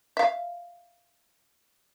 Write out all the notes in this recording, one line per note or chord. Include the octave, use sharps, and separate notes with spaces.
E5 F5